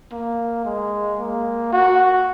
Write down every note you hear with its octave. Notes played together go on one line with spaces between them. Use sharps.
A#3
G#3
A#3
F#4